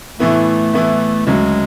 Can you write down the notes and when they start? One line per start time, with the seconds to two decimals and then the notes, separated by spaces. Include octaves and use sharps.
0.19 A2 E3 A3 B3 E4
0.73 A2 E3 B3 E4
1.26 D2 C#3 F#3 G#3